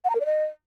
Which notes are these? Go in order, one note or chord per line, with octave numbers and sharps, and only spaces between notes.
F#5
A#5
A#4
D5
D#5